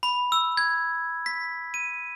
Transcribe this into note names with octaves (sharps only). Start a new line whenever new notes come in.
B5
E6
G#6
B6
D#7